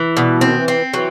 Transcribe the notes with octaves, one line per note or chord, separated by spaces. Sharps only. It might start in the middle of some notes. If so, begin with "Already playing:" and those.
Already playing: E3
B2 G3
D#3 C4
E3
C4
E3 F#3